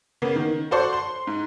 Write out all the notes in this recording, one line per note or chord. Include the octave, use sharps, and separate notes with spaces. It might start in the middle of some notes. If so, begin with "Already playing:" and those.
C#3 A#3 B3
D#3
F#4 A4 C5 D5 F#5 C#6
C6
G#2